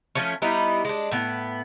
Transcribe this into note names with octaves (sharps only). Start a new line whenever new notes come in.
F3 A3 C#4
G3 B3 D#4 E4
G#3 D4
A2 B3